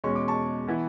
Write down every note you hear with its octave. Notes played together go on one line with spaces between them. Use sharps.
E2 B2 G#3 C#4 C#6
D6
A5 C#6
E3 B3 E4